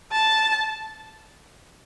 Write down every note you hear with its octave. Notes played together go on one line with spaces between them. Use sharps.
A5